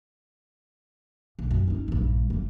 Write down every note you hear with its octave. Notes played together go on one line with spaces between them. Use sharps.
B1
F#2
C#4 D#4
A#1 G2
F1 G3